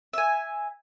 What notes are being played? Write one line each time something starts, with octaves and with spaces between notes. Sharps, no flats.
E5 G#5